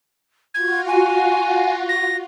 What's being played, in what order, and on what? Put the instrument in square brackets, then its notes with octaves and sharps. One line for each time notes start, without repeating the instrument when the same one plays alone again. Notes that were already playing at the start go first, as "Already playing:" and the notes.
[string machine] F4 F#4 [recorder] G#6
[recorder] G#5
A#6